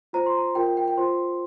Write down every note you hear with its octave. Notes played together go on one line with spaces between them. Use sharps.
F4 C5 A#5
C6
A#5
F4 A#4 G5
G5
G5
G5
F4 C5 C6